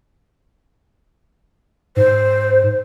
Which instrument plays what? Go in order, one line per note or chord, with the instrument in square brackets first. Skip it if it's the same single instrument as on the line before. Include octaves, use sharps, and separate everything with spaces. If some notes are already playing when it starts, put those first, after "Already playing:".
[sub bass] G#2 [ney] C5